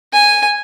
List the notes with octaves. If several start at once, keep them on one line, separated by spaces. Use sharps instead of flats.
G#5